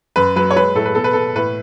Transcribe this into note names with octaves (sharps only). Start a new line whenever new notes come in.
F#2 B4
F#3 B4
C#5
G#3 B4
A2 A4
B4
B2 A4
B4
B2 A4
A2 B4